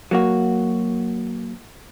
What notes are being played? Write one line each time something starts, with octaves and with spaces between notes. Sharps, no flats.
F#3 A#3 F#4